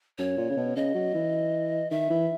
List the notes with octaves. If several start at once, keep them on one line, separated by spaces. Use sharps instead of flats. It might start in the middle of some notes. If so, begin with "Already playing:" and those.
F#2 C#5
A#2
C#3
B2
C#3 D#5
F#3
E3
D#3 E5
E3